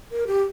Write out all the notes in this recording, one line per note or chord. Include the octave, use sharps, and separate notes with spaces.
A#4
G4